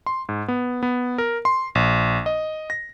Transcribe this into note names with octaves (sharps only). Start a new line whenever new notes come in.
C6
G#2
B3
B3
A#4
C6
A#1
D#5
A#6